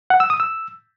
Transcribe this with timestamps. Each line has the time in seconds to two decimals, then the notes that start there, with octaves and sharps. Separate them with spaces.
0.10 F#5
0.20 E6
0.30 D#6
0.40 E6